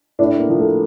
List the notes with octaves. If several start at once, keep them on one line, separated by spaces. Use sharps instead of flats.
A2 D4
A#3
F3 A#3
A3